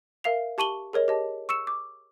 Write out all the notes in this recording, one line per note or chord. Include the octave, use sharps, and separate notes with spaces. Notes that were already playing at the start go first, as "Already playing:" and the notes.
A#4 E5 F5 C7 F7
G4 A5 C#6 D#7 F#7 G7
G#4 A#4 C#5 D#5
G4 D#5 A5
C#6 E6 C#7 E7
D6